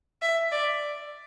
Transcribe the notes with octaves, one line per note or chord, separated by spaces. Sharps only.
E5
D5